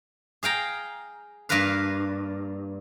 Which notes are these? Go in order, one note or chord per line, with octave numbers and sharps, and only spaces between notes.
G#4 F5 G5 A#5
G2 A#3 A#4 B4 F5